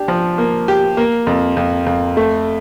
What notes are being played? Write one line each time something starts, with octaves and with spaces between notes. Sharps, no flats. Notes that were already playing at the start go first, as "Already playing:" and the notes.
Already playing: D4 G4
F3
A#3
G4
A#3
F2
F2
F2
A3